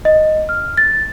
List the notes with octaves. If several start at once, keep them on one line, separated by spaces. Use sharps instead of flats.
D#5
F6
A6